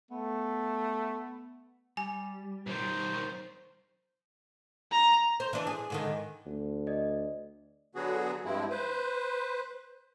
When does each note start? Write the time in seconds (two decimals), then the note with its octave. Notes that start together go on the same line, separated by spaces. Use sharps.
0.11 A3 B3
1.97 G3 G#5
2.67 B1 D#3 C5
4.92 A#5
5.40 C5
5.53 E3 D4
5.67 G#4
5.90 G#2 D3 D#3
6.46 D2
6.87 D5 D#5
7.95 D3 F#3 B3 F#4 G#4
8.45 G2 F3 G#3 C4 E4
8.70 B4 C5